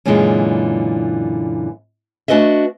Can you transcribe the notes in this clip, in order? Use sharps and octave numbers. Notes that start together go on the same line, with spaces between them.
F#2 A#2 D3 E3 G#3
A3 D4 F#4 B4 D#5 E5